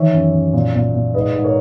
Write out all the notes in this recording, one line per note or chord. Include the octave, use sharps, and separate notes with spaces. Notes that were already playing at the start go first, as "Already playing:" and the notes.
Already playing: D#3 E3 C#5 E5
F#2
F#2
A#2
A#2
A#2
G#2 B4 D#5
G#2
A#4 C#5